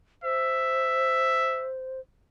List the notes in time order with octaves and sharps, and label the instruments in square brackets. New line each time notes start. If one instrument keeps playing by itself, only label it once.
[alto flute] C5 [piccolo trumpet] E5